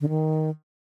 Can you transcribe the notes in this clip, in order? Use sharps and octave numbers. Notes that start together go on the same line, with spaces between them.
D3
D#3